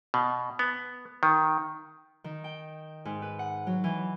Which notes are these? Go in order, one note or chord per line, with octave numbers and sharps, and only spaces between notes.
B2
B3
D#3
D#3
G5
G#2
B4
F#5
F#3
E3